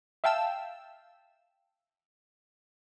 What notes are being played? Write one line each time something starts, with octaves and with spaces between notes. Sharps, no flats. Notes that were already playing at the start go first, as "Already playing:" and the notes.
E5 F5 G5 A5 E6